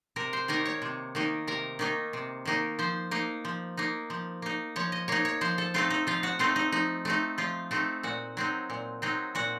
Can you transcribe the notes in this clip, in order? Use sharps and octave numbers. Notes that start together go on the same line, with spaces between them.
C3 A#4
C5
D#3 A#3 D#4 A#4
C#5
C3
D#3 A#3 D#4
C3 A#4
D#3 A#3 D#4
C3
D#3 A#3 D#4
F3 C5
A#3 D#4
F3
A#3 D#4
F3
A#3 D#4
F3 C#5
D#5
A#3 D#4 C#5
C#5
F3 C5
A4
A3 C4 D#4 F4
D#4
F3 F4
F#4
A3 C4 D#4 F4
D#4
F3 D#4
A3 C4 D#4
F3 F4
A3 C4 D#4
A#2 F#4
F#3 C4 D#4
A#2
F#3 C4 D#4
A#2 F#4